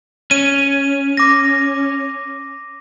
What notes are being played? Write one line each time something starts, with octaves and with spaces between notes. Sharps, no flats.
C#4 D#7
D6 A#6